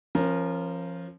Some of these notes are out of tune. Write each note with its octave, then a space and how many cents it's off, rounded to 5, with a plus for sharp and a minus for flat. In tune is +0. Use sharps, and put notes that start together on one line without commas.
F3 -20 C#4 -40 A#4 +0